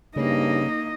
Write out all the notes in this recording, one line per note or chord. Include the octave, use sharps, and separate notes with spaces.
G2 C#3 A#3 D#4 D#5